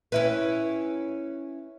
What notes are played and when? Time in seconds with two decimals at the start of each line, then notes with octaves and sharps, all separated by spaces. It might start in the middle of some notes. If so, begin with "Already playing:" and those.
0.12 C#4 E4 B4